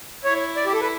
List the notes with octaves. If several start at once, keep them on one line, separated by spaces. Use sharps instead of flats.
E4 C#5
D5
G4
A4
B4